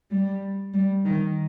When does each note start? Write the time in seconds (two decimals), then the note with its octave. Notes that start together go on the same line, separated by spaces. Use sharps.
0.11 G3
0.74 G3
1.05 D#3